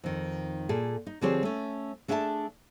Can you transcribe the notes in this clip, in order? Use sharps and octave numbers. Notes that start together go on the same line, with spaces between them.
F2 D#3
A#2 G#4 A4
D#4
D3 F3 C4 G4 G#4 C#5
A3 C#4
A3 D4 G#4 E5 G#5 A5